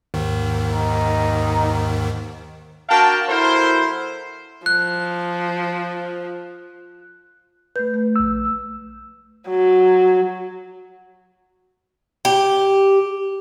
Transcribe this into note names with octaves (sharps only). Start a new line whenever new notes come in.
D#2 G#2 D#3
D#4
D4 F#4 A#4 F5 G5 A5
F#3 E4 A4 A#4 C5
F3 F#6
A3 B4 G6
A3
A#1 E6
F#3
G4